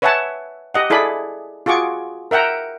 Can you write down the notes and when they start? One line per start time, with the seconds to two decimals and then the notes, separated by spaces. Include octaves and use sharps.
0.02 B4 C#5 E5 F#5 G#5 A5
0.74 G4 D#5 F#5
0.90 E4 G#4 A4 D5 B5
1.66 F4 F#4 G#4 C#6 D6
2.31 A#4 E5 F#5 G5 A#5